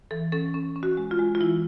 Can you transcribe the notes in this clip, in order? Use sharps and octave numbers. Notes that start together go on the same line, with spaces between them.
E3 A4
C#4 A4
C#4
C#4
F#4
G#3
F4
G#3
F4
E3 E4